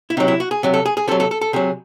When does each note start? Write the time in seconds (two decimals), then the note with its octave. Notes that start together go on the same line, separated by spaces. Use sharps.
0.10 E4
0.17 C3 F#3 D#4
0.28 E4
0.40 F#4
0.51 G#4
0.63 C3 F#3
0.74 A4
0.86 G#4
0.97 G#4
1.08 C3 A4
1.11 F#3
1.20 A4
1.31 A4
1.41 A4
1.53 C3 F#3 G#4